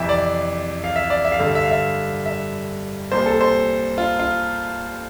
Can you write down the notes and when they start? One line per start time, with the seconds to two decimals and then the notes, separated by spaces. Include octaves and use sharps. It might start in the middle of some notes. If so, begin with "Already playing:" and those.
Already playing: F2 C3 E3 E5
0.09 D5
0.84 F5
0.96 E5
1.10 D5
1.25 E5
1.32 F5
1.39 G2 D3 E5
1.47 F5
1.55 E5
1.64 F5
1.71 E5
2.26 E5
3.12 C2 A#2 C5
3.26 A4
3.41 C5
3.98 F4
4.19 F4